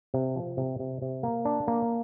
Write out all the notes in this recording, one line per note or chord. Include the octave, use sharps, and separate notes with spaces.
C3
F3
C3
C3
C3
A#3
D4
A#3